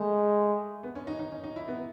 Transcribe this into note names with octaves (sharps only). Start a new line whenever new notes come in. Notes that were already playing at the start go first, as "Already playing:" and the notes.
Already playing: G#3 A3
B3
C#4
D#4
D#4
C#4
D#4
E4
B3